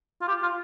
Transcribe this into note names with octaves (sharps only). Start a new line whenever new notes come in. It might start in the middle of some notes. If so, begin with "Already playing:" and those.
F4
G4
F4